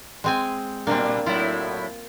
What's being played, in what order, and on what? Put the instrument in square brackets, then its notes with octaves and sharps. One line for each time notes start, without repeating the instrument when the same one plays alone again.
[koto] G#3 C4 G#5
[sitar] A#2 G3 D4 [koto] A#3 C4
[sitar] A2 F#3 E4 [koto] F4